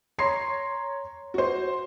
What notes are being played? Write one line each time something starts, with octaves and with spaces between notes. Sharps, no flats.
C#5 A#5 C6 C7
F#4 C5